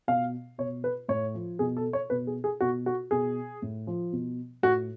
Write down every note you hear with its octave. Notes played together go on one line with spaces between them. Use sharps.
B2 F5
B2 C#5
B4
A2 C#5
F3
B2 G#4
A4
C#5
B2 B4
G#4
G#4
B2 F#4
F#4
B2 G#4
A2
F3
B2
A2 F#4